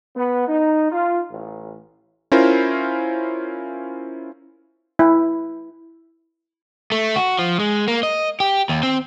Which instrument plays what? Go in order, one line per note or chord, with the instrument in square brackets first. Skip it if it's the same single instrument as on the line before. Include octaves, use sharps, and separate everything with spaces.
[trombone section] B3
D#4
F4
A1
[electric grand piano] C#4 E4 F4 A#4 C5
[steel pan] E4
[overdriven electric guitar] A3
F#4
F3
G#3
A#3
D#5
G4
D#2
C4